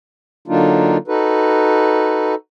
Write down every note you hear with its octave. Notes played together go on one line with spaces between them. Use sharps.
D3 F#3 A#3 D4 D#4 F4
D#4 F#4 A4 B4